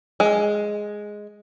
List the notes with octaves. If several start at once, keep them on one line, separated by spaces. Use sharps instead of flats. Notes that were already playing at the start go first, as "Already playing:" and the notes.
G#3